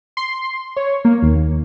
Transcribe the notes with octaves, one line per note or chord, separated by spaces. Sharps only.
C6
C#5
A#3
D#2